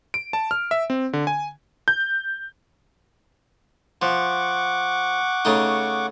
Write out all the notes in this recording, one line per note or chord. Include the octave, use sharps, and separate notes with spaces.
D7
A5
F6
E5
C4
D3
G#5
G6
F3 F#5 C#6 D6
C#3 A3 D#4